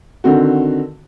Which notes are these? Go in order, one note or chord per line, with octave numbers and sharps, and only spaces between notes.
D3 D#3 C4 F#4